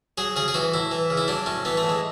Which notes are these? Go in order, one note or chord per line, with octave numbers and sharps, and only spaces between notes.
F#3 G#4
C#3 G#4
G#4
E3 F#4
A2 E4
E3
C#3
E4
F#3 D4
A2 C#4
E3 B3
A3
A2
G#3